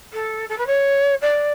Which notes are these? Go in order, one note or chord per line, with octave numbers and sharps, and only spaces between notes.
A4
A4
B4
C#5
D5